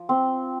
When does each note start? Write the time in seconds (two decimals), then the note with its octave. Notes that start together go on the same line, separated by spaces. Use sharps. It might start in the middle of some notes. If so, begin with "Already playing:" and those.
Already playing: F3
0.09 C4